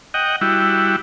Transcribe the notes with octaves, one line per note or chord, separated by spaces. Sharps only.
D#5 F#5 G5
G3 E4 F#4